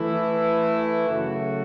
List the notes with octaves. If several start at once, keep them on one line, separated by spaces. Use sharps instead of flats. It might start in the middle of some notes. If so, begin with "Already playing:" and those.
Already playing: E3 A3 E4
F#2 C#3 A3 F#4